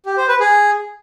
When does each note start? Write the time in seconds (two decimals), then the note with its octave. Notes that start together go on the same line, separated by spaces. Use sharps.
0.06 G4
0.17 C5
0.29 B4
0.40 G#4